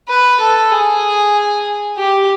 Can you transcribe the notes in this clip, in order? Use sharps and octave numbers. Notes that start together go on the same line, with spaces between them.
B4
A4
G#4
G4